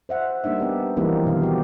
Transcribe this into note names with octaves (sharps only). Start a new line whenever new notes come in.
C5 E5 F#5
G3 A#3 D4 D#4 E5
B3 G4
E3 F3 G3 A#3 C4 D#4
B2 D#3 F5
F#4 G4